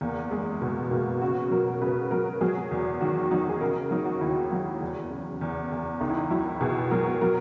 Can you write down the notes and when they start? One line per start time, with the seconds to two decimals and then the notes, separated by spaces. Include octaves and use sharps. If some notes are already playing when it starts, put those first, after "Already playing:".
0.01 E2 A#3
0.31 F#1 G#3
0.62 B2 G#3
0.80 G#3
0.91 B2 A#3
1.22 C#3 F#4
1.51 F#3 A#4
1.82 C#3 B4
2.11 F#3 A#4
2.41 F#3 G#4
2.71 E2
3.01 D#3 F#4
3.31 F#3 D#4
3.49 G#4
3.61 C#3 A#4
3.91 F#3 D#4
4.06 F#4
4.21 D#2 E4
4.52 F#3
4.81 E2
5.11 C#3
5.41 E2
5.72 E2
6.01 C#2 D#4
6.10 E4
6.18 D#4
6.30 F#3 E4
6.61 B2 G#4
6.91 F#3 A#4
7.21 F#3 A#4